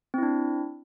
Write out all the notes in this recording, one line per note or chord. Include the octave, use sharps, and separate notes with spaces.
C4 D4 E4